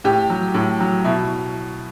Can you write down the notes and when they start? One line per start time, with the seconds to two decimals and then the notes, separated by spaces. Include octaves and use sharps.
0.04 A2 G4
0.30 F#3
0.54 A2
0.80 F#3
1.04 B2 E4